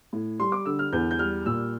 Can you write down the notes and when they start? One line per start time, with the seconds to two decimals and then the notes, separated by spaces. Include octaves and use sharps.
0.13 A2
0.39 G3 C6
0.52 D6
0.66 D3 E6
0.79 F6
0.93 E2 G6
1.11 G6
1.19 G3 F6
1.46 A#2 E6